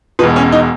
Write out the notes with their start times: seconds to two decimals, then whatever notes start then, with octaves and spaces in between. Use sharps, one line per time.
0.19 B2 B4
0.22 E1 E2
0.36 C#4
0.52 D#4